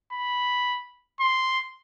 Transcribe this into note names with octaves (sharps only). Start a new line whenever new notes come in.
B5
C6